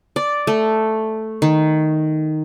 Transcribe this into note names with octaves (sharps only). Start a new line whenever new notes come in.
D5
A3
D#3